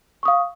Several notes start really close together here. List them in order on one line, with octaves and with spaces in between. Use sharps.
C#6 D#6 F5